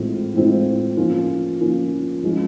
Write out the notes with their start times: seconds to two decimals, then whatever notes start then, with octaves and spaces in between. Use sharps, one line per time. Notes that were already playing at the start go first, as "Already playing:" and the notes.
Already playing: A2 E3 G#3 C4 F4
0.34 A2 E3 G#3 C4 F4
0.97 F3 A#3 C#4 F4
1.60 F3 A#3 C#4 F4
2.23 F3 G#3 C#4 F4